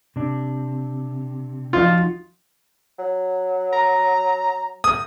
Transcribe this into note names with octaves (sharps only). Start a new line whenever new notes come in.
C3 D4
F3 D#4 F4 F#4
F#3
A#5
D#6